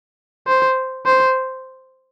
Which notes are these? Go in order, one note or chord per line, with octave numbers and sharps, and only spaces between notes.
C5
C5